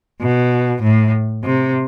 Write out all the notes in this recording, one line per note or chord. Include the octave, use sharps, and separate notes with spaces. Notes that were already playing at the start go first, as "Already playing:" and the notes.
B2
A2
C3